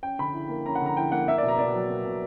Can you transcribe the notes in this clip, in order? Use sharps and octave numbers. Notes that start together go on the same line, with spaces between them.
C#4 G5
D3 B5
E4
A#3
C#4 A#5
F#5
D3 A#5
E4 G5
A#3 F#5
A#3 E5
D5
B2
A#5
B2 D5
F#3
A#3
B2